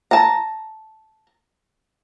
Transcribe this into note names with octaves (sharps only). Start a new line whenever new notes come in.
A5 A#5